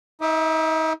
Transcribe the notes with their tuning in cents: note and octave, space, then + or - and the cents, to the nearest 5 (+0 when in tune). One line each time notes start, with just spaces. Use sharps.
D#4 +40 E5 +0 D6 +35